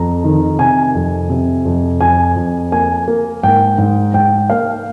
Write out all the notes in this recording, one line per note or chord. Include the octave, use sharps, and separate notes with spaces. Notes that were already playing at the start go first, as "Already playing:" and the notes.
Already playing: F2 A#5
D#3
C3 G#5
F2
C3
F2
F2 G#5
F2
A#3 G#5
A#3
G#2 G5
G#2
G#2 G5
A#3 F5